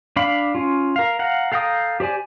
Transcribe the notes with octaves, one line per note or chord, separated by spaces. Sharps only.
D4 F5 B5
C#4 F4
A#4 F5
F5 F#5 A#5
A4 F5 G5 A#5 D#6
G4 C5 D5 G#5